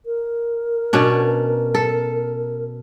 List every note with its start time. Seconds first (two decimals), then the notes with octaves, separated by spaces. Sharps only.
0.06 A#4
0.93 B2 C#4 D4
1.75 A4